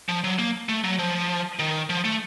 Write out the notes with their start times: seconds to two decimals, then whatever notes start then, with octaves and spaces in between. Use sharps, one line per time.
0.09 F3
0.24 F#3
0.39 A#3
0.69 A3
0.84 F#3
0.99 F3
1.59 D#3
1.89 F3
2.05 A3